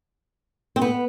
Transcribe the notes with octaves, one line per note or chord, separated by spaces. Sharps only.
C4
B3